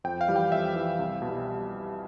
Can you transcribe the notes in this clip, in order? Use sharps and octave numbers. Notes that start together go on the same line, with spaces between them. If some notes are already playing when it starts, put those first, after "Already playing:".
F2 G5
F5
E3 G3
G5
F2 E5
E3 G3
C2
B2
G3